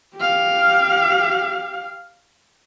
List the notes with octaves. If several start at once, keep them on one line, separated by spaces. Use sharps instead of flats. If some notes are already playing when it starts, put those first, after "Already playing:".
G4 F5